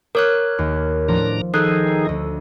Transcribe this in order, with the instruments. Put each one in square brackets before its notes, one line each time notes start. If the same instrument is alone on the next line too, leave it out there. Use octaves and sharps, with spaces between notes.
[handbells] A#4 C#5 F#6 [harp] D6 D#6 G6
[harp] D#2
[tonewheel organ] A2 D4 A#5 [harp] F3
[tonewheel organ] D#3 D#4 G#4 [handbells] A4 [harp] F#6
[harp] D2 D#5